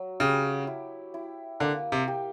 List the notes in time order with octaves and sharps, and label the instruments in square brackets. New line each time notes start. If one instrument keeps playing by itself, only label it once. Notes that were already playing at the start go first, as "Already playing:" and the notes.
Already playing: [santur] F#3
[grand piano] C#3 [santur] G4
[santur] E4
E4
[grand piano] D3 [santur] A#3
[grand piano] C3
[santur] G4